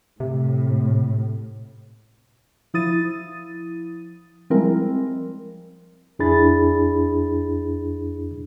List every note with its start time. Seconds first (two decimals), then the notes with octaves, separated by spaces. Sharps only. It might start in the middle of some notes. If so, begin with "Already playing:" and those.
0.20 A2 C3
2.74 F3 E4 D#6 A6 D#7
4.50 F3 G3 G#3 C4 E4 A#4
6.19 F2 D4 E4 G#4 B5 A6